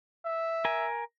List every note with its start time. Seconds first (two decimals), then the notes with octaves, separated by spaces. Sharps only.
0.25 E5
0.65 A#4 G#5